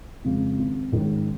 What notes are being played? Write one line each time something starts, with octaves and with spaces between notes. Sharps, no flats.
F2 C#3 G#3
G#1
G#2 D#3 G#3 C#4